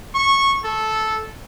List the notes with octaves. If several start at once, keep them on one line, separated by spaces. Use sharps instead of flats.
C#6
A4